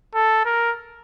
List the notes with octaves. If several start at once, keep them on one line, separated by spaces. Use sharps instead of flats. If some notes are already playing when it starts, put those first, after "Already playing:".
A4
A#4